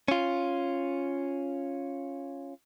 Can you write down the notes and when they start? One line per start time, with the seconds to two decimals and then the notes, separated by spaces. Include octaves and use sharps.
0.08 C#4 F4